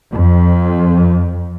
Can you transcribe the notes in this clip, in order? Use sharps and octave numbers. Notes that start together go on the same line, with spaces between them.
F2